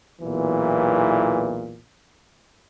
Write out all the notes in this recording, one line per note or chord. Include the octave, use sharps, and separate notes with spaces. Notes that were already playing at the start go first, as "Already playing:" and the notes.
B1 E2 A#2 E3